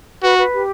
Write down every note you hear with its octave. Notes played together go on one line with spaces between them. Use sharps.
F#4 B4
B4
G4